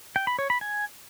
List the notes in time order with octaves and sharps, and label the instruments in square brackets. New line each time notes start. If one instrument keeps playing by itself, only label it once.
[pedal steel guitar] G5
B5
C#5
B5
G#5